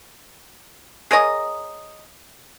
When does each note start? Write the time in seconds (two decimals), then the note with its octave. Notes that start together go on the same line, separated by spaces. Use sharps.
1.11 G#4 A#4 C#5 D#5